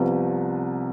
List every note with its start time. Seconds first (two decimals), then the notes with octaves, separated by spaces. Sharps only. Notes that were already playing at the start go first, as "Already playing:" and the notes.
Already playing: C2 C3 F3 B3